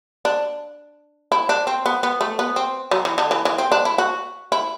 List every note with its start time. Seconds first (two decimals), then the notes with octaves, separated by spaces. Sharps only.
0.25 D4
1.32 E4
1.49 D4
1.67 C4
1.86 B3
2.03 B3
2.21 A3
2.39 B3
2.56 C4
2.91 F#3
3.05 E3
3.18 D3
3.31 E3
3.45 E3
3.58 C4
3.72 D4
3.85 E4
3.98 F#4
4.52 E4